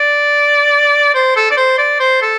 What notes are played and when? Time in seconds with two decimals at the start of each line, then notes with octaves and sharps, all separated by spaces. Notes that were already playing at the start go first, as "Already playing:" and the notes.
Already playing: D5
1.14 C5
1.36 A4
1.51 D5
1.57 C5
1.78 D5
2.00 C5
2.22 A4